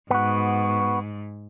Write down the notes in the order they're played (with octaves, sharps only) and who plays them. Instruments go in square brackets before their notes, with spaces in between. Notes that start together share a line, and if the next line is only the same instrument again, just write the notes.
[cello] G#2 [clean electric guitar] B3 F#4